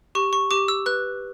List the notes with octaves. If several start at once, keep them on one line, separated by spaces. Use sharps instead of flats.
G4 C#6
C#6
G4 D6
E6
B4 F#6